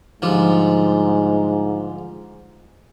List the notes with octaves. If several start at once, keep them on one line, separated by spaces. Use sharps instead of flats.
G#2 D3 F3 G3